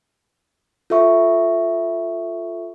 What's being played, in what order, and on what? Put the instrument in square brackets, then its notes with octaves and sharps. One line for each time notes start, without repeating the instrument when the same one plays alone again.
[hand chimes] F4 A4 E5 C#6